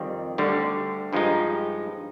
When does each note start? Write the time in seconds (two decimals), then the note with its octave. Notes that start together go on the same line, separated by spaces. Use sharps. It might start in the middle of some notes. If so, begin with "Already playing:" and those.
Already playing: F2 D#3 G3 C4
0.38 D2 D3 G3
1.13 G2 F3 G#3 D#4